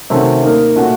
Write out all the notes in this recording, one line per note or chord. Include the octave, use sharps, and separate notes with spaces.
C3 D#3 A3 C#4 F#4
A#3 D#4 A#4
A#2 A3 C#4 F#4